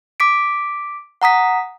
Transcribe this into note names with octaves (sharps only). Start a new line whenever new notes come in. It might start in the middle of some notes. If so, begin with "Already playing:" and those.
D6 B6 D7
F#5 A#5 D#6 B6